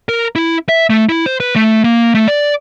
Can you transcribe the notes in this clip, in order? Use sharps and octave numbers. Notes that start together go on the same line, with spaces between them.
A#4
E4
E5
A3
E4
C5
B4
A3
A#3
A3
D5